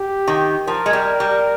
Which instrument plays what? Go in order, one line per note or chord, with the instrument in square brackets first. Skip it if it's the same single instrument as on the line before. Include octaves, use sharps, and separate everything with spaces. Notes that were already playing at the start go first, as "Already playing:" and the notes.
Already playing: [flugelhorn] G4
[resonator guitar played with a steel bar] D#3
[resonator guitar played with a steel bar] F3 [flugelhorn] A#4
[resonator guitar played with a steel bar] G#3
G3
G3